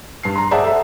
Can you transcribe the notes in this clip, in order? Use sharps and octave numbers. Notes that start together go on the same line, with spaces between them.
G2 C7
A#5 C6
G#4 C5 D5 E5 F#5 A5
A4 E5